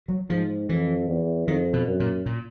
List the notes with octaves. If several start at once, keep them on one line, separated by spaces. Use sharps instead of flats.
F#3
G#2 F3
F2 E3
E2
F2 D#3
B2
F#2
A#2
A#2